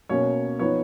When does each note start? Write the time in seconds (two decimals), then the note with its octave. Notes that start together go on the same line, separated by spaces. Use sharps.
0.09 B2 A#3 C#4 C#5
0.59 F3 B3 D#4 C#5